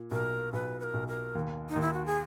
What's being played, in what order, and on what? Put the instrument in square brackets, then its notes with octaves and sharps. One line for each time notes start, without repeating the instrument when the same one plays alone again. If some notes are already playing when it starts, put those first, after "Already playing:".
Already playing: [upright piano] A#2
[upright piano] B1 [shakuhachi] A#4
[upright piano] B1 [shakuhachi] B4
[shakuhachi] B4
A#4
[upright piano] B1
[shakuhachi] A#4
[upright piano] D#2
[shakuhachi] D#4
[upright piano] D#2
[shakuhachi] E4
F#4
G#4